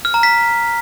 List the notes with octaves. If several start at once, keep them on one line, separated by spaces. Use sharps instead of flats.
F6
A#5
B6